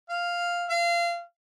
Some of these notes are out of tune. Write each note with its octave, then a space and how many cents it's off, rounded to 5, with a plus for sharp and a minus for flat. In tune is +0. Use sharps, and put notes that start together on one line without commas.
F5 +0
F5 -25